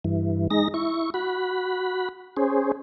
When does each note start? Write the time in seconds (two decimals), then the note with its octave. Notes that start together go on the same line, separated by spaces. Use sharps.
0.05 G2 E3
0.51 G#3 D#4 A#6
0.74 E4 C#6
1.14 F#4 B5
2.37 C#4 G#4 C5